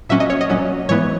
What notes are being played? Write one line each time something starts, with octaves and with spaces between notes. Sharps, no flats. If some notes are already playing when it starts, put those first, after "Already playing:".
A#2 F#3 C#4 E5
D#5
C#5
D#5
A#2 F#3 C#4
G#2 E3 B3 C#5